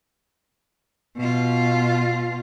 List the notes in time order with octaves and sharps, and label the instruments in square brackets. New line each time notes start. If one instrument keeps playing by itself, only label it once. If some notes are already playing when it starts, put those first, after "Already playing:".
[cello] B2 F4